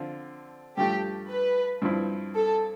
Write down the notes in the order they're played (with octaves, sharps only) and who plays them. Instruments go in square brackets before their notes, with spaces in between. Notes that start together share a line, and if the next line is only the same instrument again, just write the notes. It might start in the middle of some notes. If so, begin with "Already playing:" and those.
Already playing: [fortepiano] D3 F3 C4 F4
[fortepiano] G2 F3 A3 [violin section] G4
[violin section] B4
[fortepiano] G2 F3 C4 E4
[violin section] A4